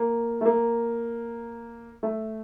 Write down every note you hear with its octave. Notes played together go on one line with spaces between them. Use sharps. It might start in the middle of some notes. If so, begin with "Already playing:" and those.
Already playing: A#3
A3
A#3
A3